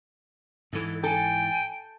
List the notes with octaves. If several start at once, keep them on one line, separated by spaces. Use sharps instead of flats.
G#2 E3 A4
A4 G5 G#5